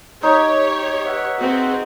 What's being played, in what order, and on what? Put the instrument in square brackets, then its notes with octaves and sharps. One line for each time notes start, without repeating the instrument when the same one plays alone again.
[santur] D#4 [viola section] G4 C#5
[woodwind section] B4 E5 F#5
[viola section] C4 F#4 G#4